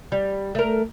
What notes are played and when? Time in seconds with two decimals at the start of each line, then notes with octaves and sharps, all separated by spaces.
0.12 G3
0.55 A3 A#4